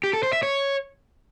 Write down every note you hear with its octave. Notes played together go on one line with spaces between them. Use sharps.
G4
A4
C5
E5
C#5